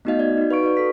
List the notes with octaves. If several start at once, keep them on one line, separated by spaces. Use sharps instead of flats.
A3 B3 D#4 F#4 D#5 F5
D5 G#6
D#4 F#4
B4 F5 C#6 D7
F#4 B4 D5
A4 B6